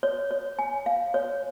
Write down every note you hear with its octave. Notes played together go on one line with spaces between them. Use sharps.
C#5
C#5
G#5
F5
C#5